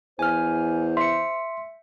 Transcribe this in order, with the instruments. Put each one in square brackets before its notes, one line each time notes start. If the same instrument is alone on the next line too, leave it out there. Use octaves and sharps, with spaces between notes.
[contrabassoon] E2 [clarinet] C5 [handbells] G#5 F6
[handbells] E5 C#7 [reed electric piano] C6